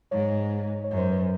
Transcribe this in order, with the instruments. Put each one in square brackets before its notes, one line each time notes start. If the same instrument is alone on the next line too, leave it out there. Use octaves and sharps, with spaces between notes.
[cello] G#2 [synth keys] C#5
[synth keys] C#5
[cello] F#2
[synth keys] C5
B4